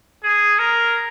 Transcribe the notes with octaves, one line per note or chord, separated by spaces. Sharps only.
G#4
A#4